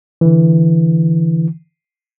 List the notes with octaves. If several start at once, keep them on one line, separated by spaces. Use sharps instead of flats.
D3 E3